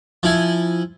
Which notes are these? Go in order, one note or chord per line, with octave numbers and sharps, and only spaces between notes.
F3 E4 G#5